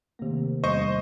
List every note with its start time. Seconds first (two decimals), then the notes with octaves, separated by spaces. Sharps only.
0.19 C3 D#3 A3 A#3
0.64 E2 G3 C5 D#5 C#6